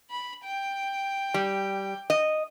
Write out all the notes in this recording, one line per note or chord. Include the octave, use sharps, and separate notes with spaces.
B5
G5
G3
D#5